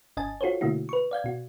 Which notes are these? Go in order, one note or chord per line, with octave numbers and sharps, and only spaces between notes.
G1 D#5 G#5 A5 A6
F4 F#4 A4 C5 C#5
B2 D3 A3 A#3 E4 F#4
B4 C#6
D5 F5 G6 G#6
B2 F#4